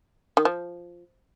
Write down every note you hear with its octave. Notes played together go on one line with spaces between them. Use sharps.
D#3
F3